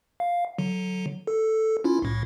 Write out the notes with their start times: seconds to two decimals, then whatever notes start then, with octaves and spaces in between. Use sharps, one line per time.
0.20 F5
0.58 D3 F#3
1.27 A4
1.84 C#4 E4 F4
2.02 C2 A2